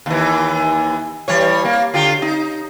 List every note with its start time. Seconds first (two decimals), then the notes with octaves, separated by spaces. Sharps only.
0.06 D#2 E3
1.28 E3 G3 C#5
1.65 A#3
1.94 D3 F4 G4
2.22 D#4